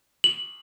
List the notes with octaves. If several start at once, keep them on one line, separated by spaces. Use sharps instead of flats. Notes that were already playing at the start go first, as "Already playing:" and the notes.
F#7